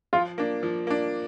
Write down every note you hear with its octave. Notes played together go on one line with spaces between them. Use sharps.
F3 F4
A#3 D4
F3
A#3 D4